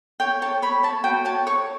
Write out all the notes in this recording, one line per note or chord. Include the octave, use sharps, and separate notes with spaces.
C#5 G5
C#5 A5
C#5 B5
C#5 A5
F#4 G5
C#5 A5
C#5 C#6